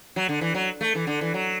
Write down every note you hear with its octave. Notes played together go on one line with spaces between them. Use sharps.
F#3
D3
E3
F#3
A3
E3
D3
E3
F#3